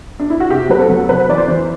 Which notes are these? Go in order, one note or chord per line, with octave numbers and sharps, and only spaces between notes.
D4
E4
F#4
C3 G4
F#3 B4
A4
F#3
C3 B4
E3 D5
C5
E3